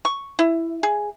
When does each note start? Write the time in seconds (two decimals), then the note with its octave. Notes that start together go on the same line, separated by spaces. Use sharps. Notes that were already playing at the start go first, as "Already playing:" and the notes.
0.05 C#6
0.39 E4
0.83 G#4